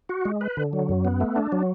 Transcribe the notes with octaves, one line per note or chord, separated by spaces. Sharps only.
F#4
G#3
B4
D3
F#3
F#2
B3
A3
D4
F#3